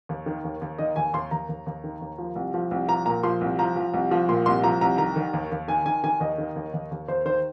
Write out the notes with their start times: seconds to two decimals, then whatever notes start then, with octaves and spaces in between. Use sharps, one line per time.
0.09 D#2
0.26 D#3
0.44 D#2
0.62 D#2
0.79 D#3 D#5
0.96 D#2 G#5
1.14 D#2 C6
1.31 D#2 A#5
1.49 D#2
1.67 D#2
1.84 D#3
2.01 D#2
2.18 F3
2.36 C2
2.54 F3
2.71 C2
2.88 F3 A#5
3.06 A#2 A#5
3.23 F3 C6
3.41 C2
3.59 F3 A#5
3.76 F3
3.94 C2
4.11 F3
4.29 A#2 C6
4.46 C2 C6
4.64 F3 A#5
4.81 C2 A#5
4.98 D#3 A#5
5.16 D#3
5.33 D#2
5.52 D#2
5.68 D#3 G#5
5.86 D#3 G#5
6.04 D#3 G#5
6.20 D#2 D#5
6.38 D#3
6.56 D#2
6.74 D#2
6.91 D#2
7.08 D#2 C5
7.25 D#3 C5